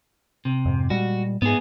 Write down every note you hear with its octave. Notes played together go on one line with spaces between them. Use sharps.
C3
F2 G#2
A#2 G3 G#3 F#4
G#2 B3 G#4